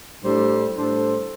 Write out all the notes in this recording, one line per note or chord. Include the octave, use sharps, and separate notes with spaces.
A2 G3 D4 A4 C5
A2 G3 D4 A4 C5